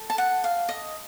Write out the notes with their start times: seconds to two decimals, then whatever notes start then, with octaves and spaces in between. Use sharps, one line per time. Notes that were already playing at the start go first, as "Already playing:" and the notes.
Already playing: A4
0.10 A5
0.18 F#5
0.44 F5
0.69 D#5